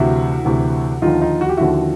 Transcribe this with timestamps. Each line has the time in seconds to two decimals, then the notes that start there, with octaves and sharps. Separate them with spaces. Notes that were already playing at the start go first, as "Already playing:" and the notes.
Already playing: D2 C3 E3 E4 F#4
0.45 D2 C3 E3
1.02 D#2 D3 F3 D#4 F4
1.21 D#4 F4
1.41 F#4
1.49 G4
1.57 D#2 D3 F3 E4 F#4